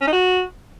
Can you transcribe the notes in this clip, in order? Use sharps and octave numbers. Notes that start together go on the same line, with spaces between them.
C#4
D#4
F#4